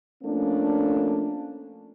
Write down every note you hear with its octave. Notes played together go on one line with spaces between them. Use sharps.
F3 A3 A#3 C#4 D4